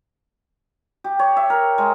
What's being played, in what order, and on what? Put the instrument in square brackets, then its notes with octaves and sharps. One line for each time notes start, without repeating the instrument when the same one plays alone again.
[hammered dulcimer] G4
C#5
E5
A#4
G#3